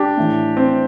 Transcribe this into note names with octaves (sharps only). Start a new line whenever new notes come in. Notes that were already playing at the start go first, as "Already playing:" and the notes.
Already playing: D4 G4
A2 E3
C4